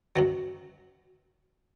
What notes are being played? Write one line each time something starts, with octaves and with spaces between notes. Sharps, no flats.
F#2 D#3 F#3